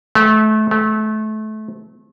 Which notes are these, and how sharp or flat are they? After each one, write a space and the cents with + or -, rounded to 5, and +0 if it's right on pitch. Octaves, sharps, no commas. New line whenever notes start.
A3 -25
A3 -25